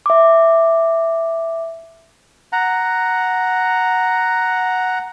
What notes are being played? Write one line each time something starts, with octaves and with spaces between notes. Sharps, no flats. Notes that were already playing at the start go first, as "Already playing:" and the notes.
E5 D6
F#5 A#5